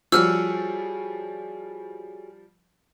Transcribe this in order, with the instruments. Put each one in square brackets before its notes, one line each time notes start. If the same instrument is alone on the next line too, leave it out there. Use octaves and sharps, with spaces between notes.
[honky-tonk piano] F3 G3 [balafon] F4 [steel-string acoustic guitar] F#4 G#4 C#5 [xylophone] E6 F6